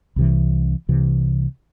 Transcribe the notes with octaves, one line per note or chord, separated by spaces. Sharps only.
C2 C3 E3
C2 C3 E3